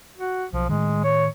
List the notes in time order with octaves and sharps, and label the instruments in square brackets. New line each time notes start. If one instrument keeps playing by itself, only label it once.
[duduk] F#4
[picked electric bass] B1 [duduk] F3
[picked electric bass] A2 D#3 [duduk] G#3
[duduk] C#5